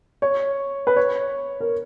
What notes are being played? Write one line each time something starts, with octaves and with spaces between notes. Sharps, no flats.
C#5
B4
C#5
A#4